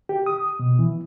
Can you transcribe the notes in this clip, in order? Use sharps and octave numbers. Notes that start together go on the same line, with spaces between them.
G4
D#6
B2
E3